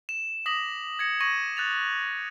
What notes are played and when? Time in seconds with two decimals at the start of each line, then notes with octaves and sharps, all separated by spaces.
0.09 E7
0.46 D6 D#6 A#6 B6 F#7
0.99 G#6 A#6 C#7
1.21 C#6 G#6 A#6 D#7 F#7
1.57 F#6 A6 F7